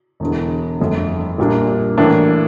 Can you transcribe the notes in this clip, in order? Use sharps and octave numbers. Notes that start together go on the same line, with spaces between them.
E1 E2 D3
G1 F2 D3 A3
A#1 A#2 G3 A#3 D4
A2 E3 A#3 D4